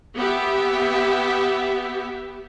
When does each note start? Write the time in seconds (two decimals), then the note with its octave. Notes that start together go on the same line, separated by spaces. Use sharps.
0.17 B3 G4 E5